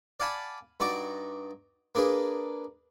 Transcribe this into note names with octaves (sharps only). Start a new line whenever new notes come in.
D5 F5 F#5 G#5 A5 B5
G2 D#4 F#4 D5 C#6 D6
A#3 D4 G#4 B4